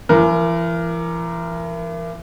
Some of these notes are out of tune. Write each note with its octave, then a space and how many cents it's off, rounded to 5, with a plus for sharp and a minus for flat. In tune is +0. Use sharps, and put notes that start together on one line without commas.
E3 +35 A#4 +0